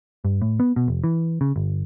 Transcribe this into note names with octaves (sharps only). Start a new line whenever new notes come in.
G2
A2
B3
B2
F1
E3
C#3
G1